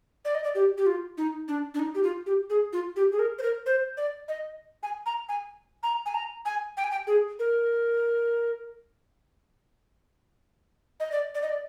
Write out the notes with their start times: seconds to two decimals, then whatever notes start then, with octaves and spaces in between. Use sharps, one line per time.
0.25 D5
0.35 D#5
0.44 D5
0.55 G4
0.78 G4
0.86 F4
1.18 D#4
1.48 D4
1.74 D4
1.79 D#4
1.95 G4
2.04 F4
2.26 G4
2.50 G#4
2.73 F4
2.96 G4
3.12 G#4
3.19 A#4
3.39 C5
3.43 A#4
3.66 C5
3.97 D5
4.28 D#5
4.83 G#5
5.06 A#5
5.29 G#5
5.83 A#5
6.06 G#5
6.14 A#5
6.45 G#5
6.77 G5
6.84 G#5
6.91 G5
7.07 G#4
7.39 A#4
11.00 D#5
11.12 D5
11.35 D5
11.42 D#5
11.49 D5